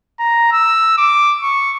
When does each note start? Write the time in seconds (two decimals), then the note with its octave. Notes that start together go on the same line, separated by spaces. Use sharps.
0.20 A#5
0.52 E6
0.98 D6
1.43 C#6